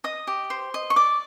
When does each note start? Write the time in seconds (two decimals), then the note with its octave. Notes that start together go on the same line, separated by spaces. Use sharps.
0.04 D#5 D#6
0.27 G4
0.50 C5
0.74 D#5
0.90 C#6
0.96 D5 D6